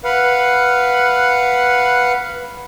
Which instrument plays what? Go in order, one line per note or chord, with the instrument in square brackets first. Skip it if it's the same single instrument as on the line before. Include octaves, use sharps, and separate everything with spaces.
[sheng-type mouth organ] B4 F5 F#5